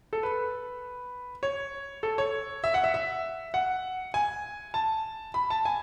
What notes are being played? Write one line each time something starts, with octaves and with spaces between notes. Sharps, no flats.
A4
B4
C#5
A4
C#5
E5
F#5
E5
E5
F#5
G#5
A5
B5
A5
G#5